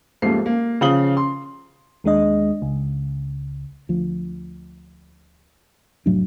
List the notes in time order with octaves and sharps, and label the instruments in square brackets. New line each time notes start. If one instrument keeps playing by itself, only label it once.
[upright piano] D#2 G#2 F3 A3 F4 C7
A#3
C#3 F3 F5 D#6 F#7 G7
C6
[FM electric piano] D#2 G#3 D4 D#5
C#2
[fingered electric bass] D2 F3
F1 A2 F#3 D4